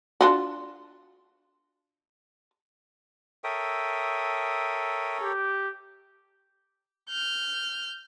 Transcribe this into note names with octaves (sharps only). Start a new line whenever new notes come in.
D4 F4 F#4
A4 A#4 C#5 E5 G5 D#6
G4
F6 G6